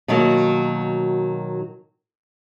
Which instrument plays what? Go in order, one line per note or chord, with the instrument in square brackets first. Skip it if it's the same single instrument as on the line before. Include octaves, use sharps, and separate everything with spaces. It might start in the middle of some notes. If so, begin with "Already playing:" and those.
[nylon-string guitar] B2 D#3 F#3 A#3